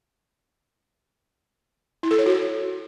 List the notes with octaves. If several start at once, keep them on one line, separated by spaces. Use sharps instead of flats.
E4
A4
C#5
F#4